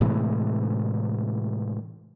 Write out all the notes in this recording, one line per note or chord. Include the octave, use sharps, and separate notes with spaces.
A2 C3 E3 G#3